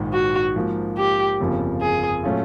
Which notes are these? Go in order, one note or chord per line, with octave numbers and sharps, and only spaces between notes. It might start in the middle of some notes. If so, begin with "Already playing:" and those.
Already playing: A#1 G#2 D#3
F#4
G#2 F3 A#3
G4
G1 F2 C#3 F3 A#3
G#4
A#2 F#3 A3 C#4 F4